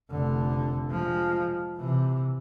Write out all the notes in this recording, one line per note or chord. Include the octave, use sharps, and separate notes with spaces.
F1 D3
F3 G#3
C3 E3